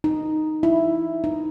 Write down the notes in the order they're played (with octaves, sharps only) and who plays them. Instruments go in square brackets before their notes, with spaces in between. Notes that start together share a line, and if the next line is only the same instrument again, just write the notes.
[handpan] D#4
E4
D#4